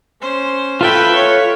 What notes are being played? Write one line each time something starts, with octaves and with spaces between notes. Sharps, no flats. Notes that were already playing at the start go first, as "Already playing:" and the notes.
C#4 C5
F4 A4 B4 E5 G5
C#5